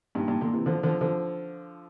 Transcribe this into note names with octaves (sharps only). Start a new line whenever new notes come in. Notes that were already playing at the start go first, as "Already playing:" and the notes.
G2 A#2
G2 A#2
A#2 D3
C3 E3
D3 F3
D3 F3
D3 F3